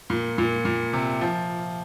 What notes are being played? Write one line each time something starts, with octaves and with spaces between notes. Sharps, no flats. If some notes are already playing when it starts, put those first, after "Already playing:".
A#2
A#2
A#2
C3
F3